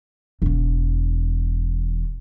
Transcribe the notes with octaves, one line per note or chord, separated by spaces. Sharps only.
E1 E2